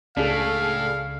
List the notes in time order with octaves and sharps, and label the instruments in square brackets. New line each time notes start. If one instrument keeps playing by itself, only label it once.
[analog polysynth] C#2 C#3 [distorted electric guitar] A2 [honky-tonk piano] D4 G#4 A4 [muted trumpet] F5